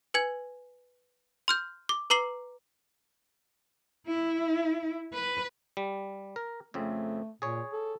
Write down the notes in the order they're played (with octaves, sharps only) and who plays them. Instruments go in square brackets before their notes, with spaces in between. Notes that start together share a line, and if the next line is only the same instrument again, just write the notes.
[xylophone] B4 G#5 G#6
C6 F6 G6
D6
B4 A#5 D6 C7 F#7
[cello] E4
B4
[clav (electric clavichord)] G3
A#4
[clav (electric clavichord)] F2 C#3 C4 [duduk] A3
[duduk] A#2 [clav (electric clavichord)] G#4 C#5
[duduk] A4